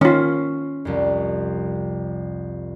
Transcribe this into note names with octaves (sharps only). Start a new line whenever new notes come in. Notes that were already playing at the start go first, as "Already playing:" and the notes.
D#3 C#4 F4
C2 F2